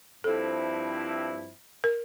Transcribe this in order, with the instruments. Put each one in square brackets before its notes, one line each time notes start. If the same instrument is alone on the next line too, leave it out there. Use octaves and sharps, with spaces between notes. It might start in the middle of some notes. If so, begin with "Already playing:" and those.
[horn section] G2 F3 C4 E4 [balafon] A4
[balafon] A#4